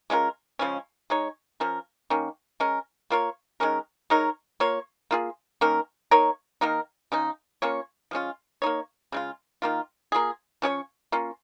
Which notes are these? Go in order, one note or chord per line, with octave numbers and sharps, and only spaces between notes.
G#3 C#4 F4 A#4
C#3 F3 G#3 C#4
G#3 D#4 C#5
F3 C#4 A#4
D#3 A#3 C#4
G#3 C#4 A#4
A#3 F4 A#4 C#5
D#3 G#3 C#4 A#4
G#3 D#4 A#4 C#5
A#3 F4 C#5
A#3 F4 G#4
D#3 A#3 C#4 A#4
A#3 D#4 A#4 C#5
D#3 A#3 D#4 A#4
C#3 G#3 D#4
A#3 C#4 F4 C#5
F3 G#3 C#4 F4
A#3 D#4 C#5
C#3 G#3 F4
D#3 A#3 F4
A#3 F4 G#4
F3 C#4 G#4 C#5
A#3 C#4 F4